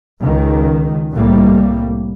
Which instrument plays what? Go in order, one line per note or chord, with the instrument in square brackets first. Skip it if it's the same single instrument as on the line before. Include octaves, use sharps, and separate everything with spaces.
[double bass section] C#2 D#3
C2 A2 G3 A#3